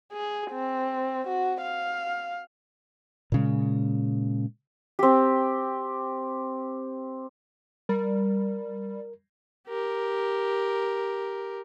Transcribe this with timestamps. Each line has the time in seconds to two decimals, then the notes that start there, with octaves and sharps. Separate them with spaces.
0.13 G#4
0.51 C4
1.28 F#4
1.62 F5
3.32 A#2 C#3 G#3
4.99 C4 G4
7.89 G3 A#4
9.68 G4 A#4